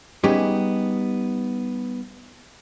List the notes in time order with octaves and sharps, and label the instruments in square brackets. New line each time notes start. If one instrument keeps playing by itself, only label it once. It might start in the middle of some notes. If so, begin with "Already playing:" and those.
[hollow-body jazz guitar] G3 B3 C#4 D#4 G4 G#4